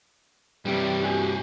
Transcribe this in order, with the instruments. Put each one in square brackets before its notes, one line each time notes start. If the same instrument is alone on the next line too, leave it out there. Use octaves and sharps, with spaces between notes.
[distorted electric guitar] G2 C3 [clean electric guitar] G3 G4
[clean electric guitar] F#4 G4 G#5